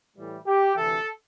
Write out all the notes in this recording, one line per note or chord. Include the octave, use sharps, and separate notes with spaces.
A2 E3 G3
G4
D2 C3 E3 A4